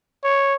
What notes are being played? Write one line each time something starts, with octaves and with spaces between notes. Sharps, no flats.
C#5